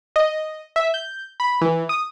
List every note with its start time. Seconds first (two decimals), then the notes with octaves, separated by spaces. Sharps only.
0.16 D#5
0.76 E5
0.94 G6
1.40 B5
1.61 E3
1.89 D#6